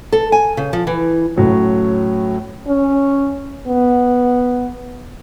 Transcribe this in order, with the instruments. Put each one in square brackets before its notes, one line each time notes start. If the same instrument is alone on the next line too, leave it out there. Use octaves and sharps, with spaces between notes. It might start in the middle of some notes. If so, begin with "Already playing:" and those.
[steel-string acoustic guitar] A4
G#5
C#3
F3
E3
[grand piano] A2 F#3 C#4
[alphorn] C#4
B3